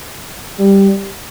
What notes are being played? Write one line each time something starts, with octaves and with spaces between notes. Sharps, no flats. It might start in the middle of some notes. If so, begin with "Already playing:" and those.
G3